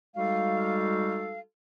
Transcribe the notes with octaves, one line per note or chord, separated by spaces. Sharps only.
G3 G#3 D#4 F#4 A4 F5